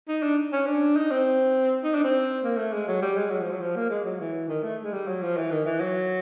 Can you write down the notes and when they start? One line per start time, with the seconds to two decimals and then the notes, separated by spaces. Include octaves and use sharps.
0.08 D#4
0.23 D4
0.52 C#4
0.67 D4
0.96 D#4
1.11 C4
1.84 D#4
1.95 D4
2.04 C4
2.44 A#3
2.57 A3
2.73 G#3
2.88 F#3
3.02 G3
3.16 G#3
3.31 F#3
3.41 F3
3.50 F#3
3.60 F3
3.76 A#3
3.90 G#3
4.04 F#3
4.20 E3
4.48 D#3
4.63 A3
4.83 G#3
4.92 G3
5.08 F#3
5.22 F3
5.37 E3
5.51 D#3
5.65 E3
5.80 F#3